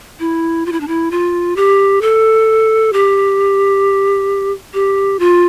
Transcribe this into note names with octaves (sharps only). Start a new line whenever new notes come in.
E4
F4
E4
D4
E4
F4
G4
A4
G4
G4
F4